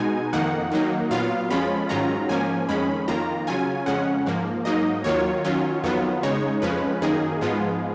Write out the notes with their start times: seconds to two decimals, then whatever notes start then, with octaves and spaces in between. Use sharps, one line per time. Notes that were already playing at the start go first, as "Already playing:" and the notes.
Already playing: B2 G#3 D#4 G#5
0.33 F2 D#3 A#3 D#4 F#5
0.71 D#3 F#3 A#3 D#4
1.11 A#2 F#3 B3 F4 F5
1.50 F2 F3 G#3 C#4 F4 B5
1.89 G#2 D#3 F#3 C#4 F4 A#5
2.29 G#2 F3 A#3 C#4 G#5
2.69 F2 D#3 G#3 C#4 B5
3.08 F2 D#3 A#3 F4 A#5
3.47 C#3 F#3 C#4 F4 G#5
3.86 F2 C#3 G#3 C#4 F#5
4.26 G#2 F3 A#3
4.65 G#2 F#3 A#3 D#4 D#5
5.04 D#2 D#3 F#3 A#3 F4 C#5
5.44 D#3 F#3 C#4 F4
5.84 F2 D#3 F#3 B3 F4
6.23 C#3 G#3 D#4 C#5
6.62 F2 F3 G#3 C#4 B4
7.02 F#2 D#3 A#3 D#4 G#4
7.41 G#2 F3 G#3 B3 F4